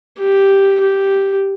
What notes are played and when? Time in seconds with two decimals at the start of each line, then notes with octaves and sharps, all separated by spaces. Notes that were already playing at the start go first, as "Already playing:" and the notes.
0.20 G4
0.81 G4